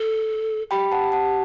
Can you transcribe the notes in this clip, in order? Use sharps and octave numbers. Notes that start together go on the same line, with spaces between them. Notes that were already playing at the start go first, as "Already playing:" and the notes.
Already playing: A4
G4 G5 B5
F#5 A5
F#5 A5